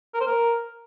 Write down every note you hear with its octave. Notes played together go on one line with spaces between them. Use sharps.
A#4
C5
A#4